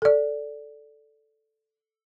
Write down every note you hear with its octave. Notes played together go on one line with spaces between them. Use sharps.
A4 D5